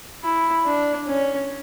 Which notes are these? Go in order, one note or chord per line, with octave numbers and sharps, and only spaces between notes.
E4
D4
C#4